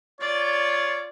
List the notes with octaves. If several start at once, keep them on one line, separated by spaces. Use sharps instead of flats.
F4 C#5 D5